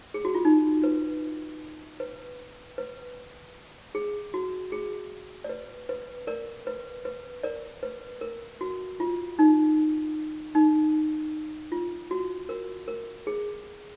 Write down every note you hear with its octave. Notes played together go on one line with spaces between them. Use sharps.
G#4
F#4
F4
D#4
B4
B4
B4
G#4
F#4
G#4
D5
B4
B4
A#4 D5
B4
B4
A#4 D5
B4
A#4
F#4
F4
D#4
D#4
F4
F#4
A#4
A#4
G#4